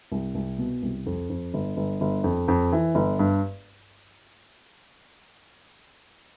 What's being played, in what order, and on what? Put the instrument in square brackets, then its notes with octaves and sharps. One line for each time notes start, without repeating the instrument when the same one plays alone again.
[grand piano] C2
C2
B2
C2
F2
F2
G1
G1
G1
F2
F2
E3
G1
G2